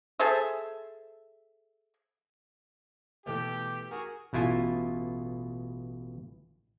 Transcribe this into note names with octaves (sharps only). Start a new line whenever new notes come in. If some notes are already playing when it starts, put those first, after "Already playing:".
G#4 A4 C5 E5
B2 E3 A3 G4
F#4 G#4 A#4
A1 B2 E4 F4 G#5